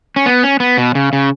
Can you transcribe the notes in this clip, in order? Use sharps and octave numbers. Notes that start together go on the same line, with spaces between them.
C#4
B3
C#4
B3
B2
C#3
C#3